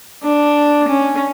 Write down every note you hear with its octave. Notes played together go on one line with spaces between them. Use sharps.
D4
C#4